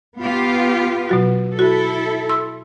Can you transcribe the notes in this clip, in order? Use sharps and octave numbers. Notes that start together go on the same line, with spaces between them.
B3 F4 G4
B2 F#3 F#4
E4 F#4 A4
C6 E6